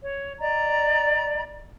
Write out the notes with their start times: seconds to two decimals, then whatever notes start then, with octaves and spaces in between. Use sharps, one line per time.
0.03 C#5
0.40 D5 D#5 A#5